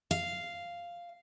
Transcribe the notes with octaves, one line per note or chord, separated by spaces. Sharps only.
F5